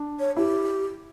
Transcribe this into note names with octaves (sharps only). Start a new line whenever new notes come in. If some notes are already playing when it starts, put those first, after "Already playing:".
Already playing: D4
C#5
E4 G4